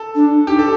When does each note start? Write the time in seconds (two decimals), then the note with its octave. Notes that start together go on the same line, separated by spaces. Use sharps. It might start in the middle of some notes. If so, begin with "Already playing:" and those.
Already playing: A4
0.15 D4
0.47 D#4 G4
0.59 A4